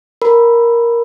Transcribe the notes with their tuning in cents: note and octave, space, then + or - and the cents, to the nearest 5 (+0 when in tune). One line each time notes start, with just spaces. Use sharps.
A#4 +5 B5 -5